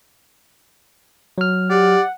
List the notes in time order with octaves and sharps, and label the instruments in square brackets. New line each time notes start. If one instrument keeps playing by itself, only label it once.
[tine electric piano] F#3 F6
[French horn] G4 [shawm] D5 [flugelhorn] F#5